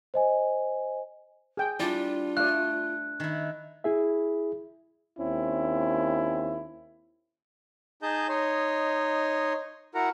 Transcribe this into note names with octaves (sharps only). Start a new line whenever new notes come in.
C5 D#5 G#5
G#4 G5
G3 D4 E4 F4 D5
A3 D5 F5 F#6
D#3 E4
E4 G#4 E5
D#2 C4 C#4 E4
D#4 G#4 D#5 A5 G6
D#4 C#5 D#5 C6
E4 F#4 A#4 F#5 A#5